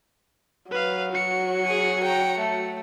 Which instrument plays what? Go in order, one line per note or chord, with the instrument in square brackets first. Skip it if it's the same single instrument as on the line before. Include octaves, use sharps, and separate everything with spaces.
[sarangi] F#3 [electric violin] B4 F5
[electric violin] F#4 C#7
[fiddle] G#4 G#5
G5 A#5
A3